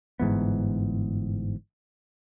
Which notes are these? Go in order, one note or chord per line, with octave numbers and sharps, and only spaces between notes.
G1 G#2 E3 B3